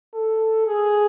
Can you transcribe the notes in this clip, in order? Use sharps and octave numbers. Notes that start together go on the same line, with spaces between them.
A4
G#4